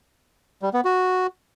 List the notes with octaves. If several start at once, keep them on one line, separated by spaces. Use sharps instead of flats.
G3
B3
F#4